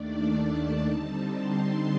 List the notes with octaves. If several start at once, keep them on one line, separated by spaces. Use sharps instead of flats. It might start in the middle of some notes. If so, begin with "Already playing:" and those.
Already playing: D#2 D#3 A3 D4 D5
A5
D3 G3 C4 D#4
C6